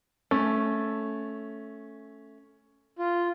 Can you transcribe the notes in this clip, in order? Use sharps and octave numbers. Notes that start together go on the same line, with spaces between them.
A3 C#4
F4